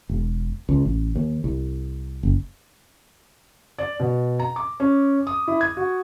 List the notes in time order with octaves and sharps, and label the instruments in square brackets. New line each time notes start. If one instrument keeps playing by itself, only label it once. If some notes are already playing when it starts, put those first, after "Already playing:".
[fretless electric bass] E1
C#2
A1
D#2
C2
F#1
[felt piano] D5
B2
A#5
D6
C#4
D#6
E4
G#6
F#4